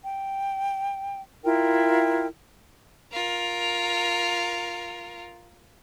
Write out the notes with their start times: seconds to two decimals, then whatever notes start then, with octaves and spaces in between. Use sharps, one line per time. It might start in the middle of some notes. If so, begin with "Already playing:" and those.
0.05 G5
1.44 E4 F4 A#4 G5
3.13 F4 A#4